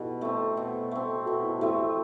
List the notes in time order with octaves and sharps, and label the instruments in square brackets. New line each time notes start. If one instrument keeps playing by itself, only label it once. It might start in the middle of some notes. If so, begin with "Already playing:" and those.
Already playing: [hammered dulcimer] B2 [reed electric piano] D#4 E4 F#4 G4 A4
[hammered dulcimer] A3 C4
B2
A3 C4
[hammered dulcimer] B2 [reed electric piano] F#4 A4
[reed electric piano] E4
F#4
[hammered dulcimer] A3 C4 [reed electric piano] E4 G4